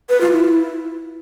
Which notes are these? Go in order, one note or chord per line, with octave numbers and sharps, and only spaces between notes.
B4
F4
E4